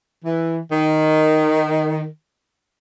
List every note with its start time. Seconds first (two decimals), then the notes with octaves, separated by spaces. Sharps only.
0.25 E3
0.72 D#3